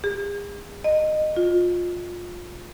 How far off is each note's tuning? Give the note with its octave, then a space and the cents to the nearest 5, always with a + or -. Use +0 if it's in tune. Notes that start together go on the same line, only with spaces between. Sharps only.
G#4 -40
D#5 -15
F4 +20